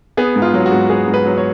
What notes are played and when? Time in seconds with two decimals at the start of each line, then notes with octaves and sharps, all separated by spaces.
0.17 B3 G#4
0.36 G#2
0.42 F4
0.54 F#3
0.66 F#4
0.72 G#2
0.90 B3 G#4
1.08 G#2
1.14 B4
1.26 F#3
1.38 C#5